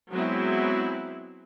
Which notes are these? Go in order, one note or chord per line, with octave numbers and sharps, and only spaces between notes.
F#3 G#3 B3 C4 E4